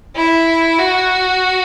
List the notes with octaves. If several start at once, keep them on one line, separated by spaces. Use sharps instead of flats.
E4
F#4